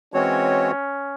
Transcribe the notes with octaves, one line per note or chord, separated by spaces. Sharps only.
E3 G#3 C4 C#4 F#4 C#5